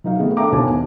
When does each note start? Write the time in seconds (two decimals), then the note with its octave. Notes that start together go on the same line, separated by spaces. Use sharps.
0.04 F#3 D#4 F5
0.19 D#3 A3 B3 G#4
0.37 D4 A4 E5 G5 A#5 D6
0.52 D#2 D#3 A#3 B3 G#5 A5
0.70 B2